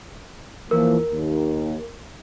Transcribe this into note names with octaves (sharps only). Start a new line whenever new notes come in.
E3 F3 A#3 A#4
D#2